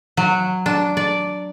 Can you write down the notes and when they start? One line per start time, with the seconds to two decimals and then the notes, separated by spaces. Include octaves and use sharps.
0.17 F#3
0.66 D4
0.97 D5